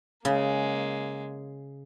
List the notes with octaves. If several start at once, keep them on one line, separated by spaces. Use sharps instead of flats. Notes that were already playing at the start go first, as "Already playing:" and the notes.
C#3 G#3 A#3